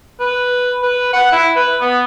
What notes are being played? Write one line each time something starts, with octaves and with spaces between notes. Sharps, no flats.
B4
B4
F#5
E4
B4
B3